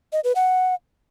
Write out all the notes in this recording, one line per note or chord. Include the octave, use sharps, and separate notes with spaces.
D#5
B4
F#5